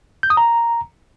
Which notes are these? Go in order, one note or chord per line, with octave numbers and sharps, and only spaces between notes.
G6
D#6
A#5